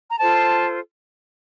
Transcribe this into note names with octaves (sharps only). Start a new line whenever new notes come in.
A#5
F4 A4 C5 A5